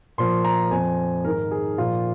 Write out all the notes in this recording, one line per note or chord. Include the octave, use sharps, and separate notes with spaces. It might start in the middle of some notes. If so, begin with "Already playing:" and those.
A#2 F3 C6
A#5
F2 F3 G#5
G#2 D#3 A#4
G#4
A#2 F3 F4